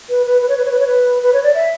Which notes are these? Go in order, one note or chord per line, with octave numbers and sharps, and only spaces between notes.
B4
B4
B4
C#5
B4
C#5
B4
C#5
B4
B4
C#5
D5
E5